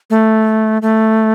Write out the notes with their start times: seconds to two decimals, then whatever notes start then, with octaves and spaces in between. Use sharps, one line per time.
0.10 A3
0.82 A3